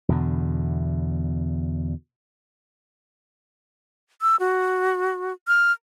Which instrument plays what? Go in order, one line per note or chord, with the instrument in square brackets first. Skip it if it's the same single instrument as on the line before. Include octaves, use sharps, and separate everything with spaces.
[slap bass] E2 B2 D3
[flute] E6
F#4
F6